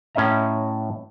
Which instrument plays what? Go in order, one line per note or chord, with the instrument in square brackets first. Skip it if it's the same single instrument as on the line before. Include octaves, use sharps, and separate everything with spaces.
[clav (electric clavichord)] A2 C#4 D#5 E5 A#5